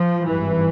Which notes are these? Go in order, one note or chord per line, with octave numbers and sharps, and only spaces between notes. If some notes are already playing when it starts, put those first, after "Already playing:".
Already playing: F3
G#1 G2 E3